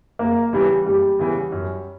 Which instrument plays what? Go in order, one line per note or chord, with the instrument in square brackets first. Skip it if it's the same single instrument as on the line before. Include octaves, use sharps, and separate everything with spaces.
[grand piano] F#1 [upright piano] A#3
[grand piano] E2 C#3 E3 [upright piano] G3
[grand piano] F#1 [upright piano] G3
[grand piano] E2 C#3 E3
F#2